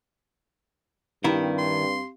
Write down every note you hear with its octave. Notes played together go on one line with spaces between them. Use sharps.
G2 D#3 C4 E4 G4 F5
C6